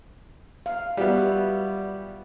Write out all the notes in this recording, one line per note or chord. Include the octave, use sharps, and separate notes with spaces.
F5
G3 B3 F4 F#4 E5